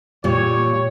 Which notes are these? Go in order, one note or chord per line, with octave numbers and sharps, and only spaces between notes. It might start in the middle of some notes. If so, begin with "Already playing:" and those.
A#2 G3 C#5